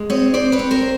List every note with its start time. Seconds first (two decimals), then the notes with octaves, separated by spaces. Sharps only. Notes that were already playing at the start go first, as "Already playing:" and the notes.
Already playing: G#3
0.10 C4 C#5 D#5
0.34 C4 C5 D5
0.52 B4 C#5
0.59 C4
0.71 A#4 C5